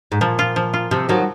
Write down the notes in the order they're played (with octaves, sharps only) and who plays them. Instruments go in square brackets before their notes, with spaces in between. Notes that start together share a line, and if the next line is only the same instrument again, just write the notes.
[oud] G#2
[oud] A#2 [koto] F3
[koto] F4
F3
F4
[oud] C3 [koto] F3
[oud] D#3 F#3 [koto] F3